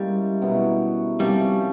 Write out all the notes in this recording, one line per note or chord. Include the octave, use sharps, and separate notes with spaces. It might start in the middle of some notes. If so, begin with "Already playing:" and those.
Already playing: G3 G#3 A#3 C#4 E4
B2 F#3 B3 E4
C3 F3 G3 A#3 C#4